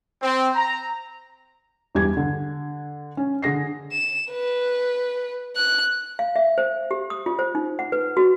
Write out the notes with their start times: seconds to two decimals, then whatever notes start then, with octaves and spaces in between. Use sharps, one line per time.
0.22 C4
0.55 A#5
1.95 E2 G2 G4 G#6
2.17 D3
3.17 C#4
3.42 D3 G#4 A#6 C7
3.92 E7
4.32 B4
5.56 F#6
6.19 F5
6.36 E5
6.58 C5
6.91 G4
7.10 D#6
7.26 F4
7.39 C5
7.55 D#4
7.79 F#5
7.92 B4
8.17 F#4